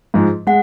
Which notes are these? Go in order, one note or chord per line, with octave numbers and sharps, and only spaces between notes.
G#2 F3 G#3
G#3 F#5